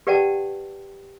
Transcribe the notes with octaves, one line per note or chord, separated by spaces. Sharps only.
G4 B4 D5 F#5 G5 A5